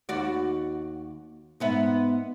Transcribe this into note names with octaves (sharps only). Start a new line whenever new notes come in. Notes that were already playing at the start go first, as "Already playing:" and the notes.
D#2 F#4 D5
G#2 B3 E5